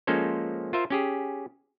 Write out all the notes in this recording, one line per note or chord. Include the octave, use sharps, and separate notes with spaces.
F3 G#3 A#3 C#4 A4 C5
F4 A#4 C5 E5
C#4 G4 G#4